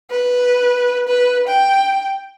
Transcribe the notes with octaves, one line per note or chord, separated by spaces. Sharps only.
B4
B4
G5